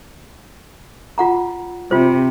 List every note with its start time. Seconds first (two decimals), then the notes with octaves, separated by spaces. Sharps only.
1.18 F4 F#5 A#5
1.91 C3 F4 C5